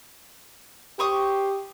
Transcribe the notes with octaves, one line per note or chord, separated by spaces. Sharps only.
G4 C5 C#6 D#6